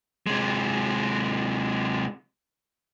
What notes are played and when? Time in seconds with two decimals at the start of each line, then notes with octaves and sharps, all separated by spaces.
0.27 C3 G#3